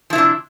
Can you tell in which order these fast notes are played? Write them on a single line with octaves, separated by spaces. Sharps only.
F3 E4 C3 D4